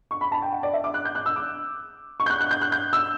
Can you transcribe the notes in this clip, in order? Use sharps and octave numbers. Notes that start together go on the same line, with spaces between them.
C#6
B5
A5
G5
F#5
D5
E5
D6
F#6
G6
F#6
E6
D6
C#6
G6
F#6
F#6
G6
F#6
G6
E6